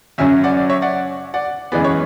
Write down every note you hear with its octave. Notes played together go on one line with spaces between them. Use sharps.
F#2 C#3 F#3 C#4 E5 G#5
D5 F#5
D5
C#5 E5
D5 F#5
D5 F#5
F#2 E3 G#3 B3 D5
C#5